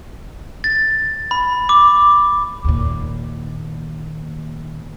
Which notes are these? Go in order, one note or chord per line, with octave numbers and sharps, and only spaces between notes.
A6
B5
D6
D#2 A#2